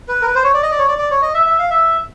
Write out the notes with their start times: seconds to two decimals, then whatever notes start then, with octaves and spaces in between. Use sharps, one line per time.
0.08 B4
0.22 A#4
0.27 B4
0.35 C5
0.44 C#5
0.54 D5
0.63 D#5
0.71 D5
0.79 C#5
0.88 D5
0.98 D5
1.11 C#5
1.22 D#5
1.34 E5
1.46 E5
1.59 F5
1.70 E5